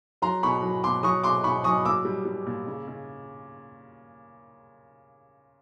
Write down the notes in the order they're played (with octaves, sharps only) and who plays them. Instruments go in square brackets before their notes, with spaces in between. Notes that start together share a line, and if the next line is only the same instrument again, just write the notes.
[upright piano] F#3 A#5 C6
B2 B5 C#6
F#3
B2 C6 D6
F#3 C#6 D#6
B2 C6 D6
B2 B5 C#6
F#3 C#6 D#6
A#2 D6 E6
G3
G3
A#2
C#3
C#3